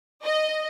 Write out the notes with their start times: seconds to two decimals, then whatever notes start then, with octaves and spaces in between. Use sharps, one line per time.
0.23 D#5